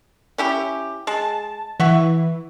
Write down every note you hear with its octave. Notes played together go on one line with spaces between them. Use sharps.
C#4 E4 G4
G#3 A5
E3 E5 F#5 C#6